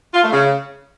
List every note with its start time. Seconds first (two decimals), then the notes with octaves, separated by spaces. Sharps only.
0.14 F4
0.23 A3
0.32 C#3